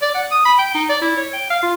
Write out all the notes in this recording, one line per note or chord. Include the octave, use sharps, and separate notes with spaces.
D5
F#5
D#6
B5
G5
D#4
D5
E4
C#5
G5
F5
F4